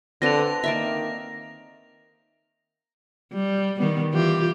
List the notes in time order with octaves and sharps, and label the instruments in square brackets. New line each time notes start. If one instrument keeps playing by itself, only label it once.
[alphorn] D3 [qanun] C4 A4 B4 [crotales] A#6 F7
[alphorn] D#3 [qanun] A#3 D5 E5
[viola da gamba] G3
D#3 G3 B3
E3 F4 G4